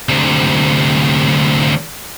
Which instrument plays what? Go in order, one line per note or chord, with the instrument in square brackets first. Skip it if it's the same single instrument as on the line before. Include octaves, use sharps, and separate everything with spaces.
[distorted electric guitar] D2 C3